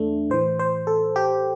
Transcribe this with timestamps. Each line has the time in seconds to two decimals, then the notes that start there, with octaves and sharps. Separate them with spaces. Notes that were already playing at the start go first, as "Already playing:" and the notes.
Already playing: E2 A3 D4
0.30 A2 E3 C5
0.59 C5
0.87 A4
1.16 G4